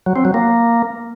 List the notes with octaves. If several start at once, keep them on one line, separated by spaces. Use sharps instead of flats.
F#3
C4
F#3
A#3